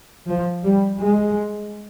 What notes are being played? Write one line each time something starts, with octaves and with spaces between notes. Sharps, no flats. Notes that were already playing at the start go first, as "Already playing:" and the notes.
F3
G3
G#3